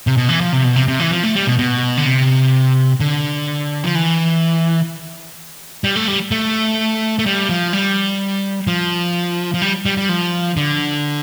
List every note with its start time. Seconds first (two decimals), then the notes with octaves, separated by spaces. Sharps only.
0.07 C3
0.17 B2
0.29 E3
0.41 F3
0.53 C3
0.64 B2
0.76 C3
0.88 C3
1.00 E3
1.11 F3
1.23 A3
1.35 G3
1.47 B2
1.59 B2
1.97 D3
2.06 C3
3.00 D3
3.84 F3
3.95 E3
5.84 G3
5.96 A3
6.08 G3
6.31 A3
7.19 A3
7.26 G3
7.49 F3
7.73 G3
8.67 F3
9.54 F3
9.62 G3
9.86 G3
9.97 G3
10.09 F3
10.57 D3